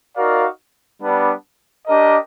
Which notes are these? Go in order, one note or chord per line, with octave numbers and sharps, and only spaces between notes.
D#4 F#4 A#4 D5 F5
G3 B3 D4
D4 G4 A#4 D#5